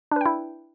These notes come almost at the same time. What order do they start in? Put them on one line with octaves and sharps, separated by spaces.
D4 B4 G5 E4